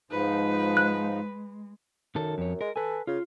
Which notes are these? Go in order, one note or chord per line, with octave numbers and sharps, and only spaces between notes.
G#2 F3 G#3 D#4 B4
F#6
F#2 D#3 A4
F2 C#5
G#3 A#4
A4 B4 G#5
C#3 F4